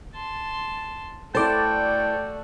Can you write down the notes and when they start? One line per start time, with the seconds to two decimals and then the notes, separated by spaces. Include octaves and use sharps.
0.15 A5 C6
1.35 A3 E4 F#4 A4 C5 D5 G5 A5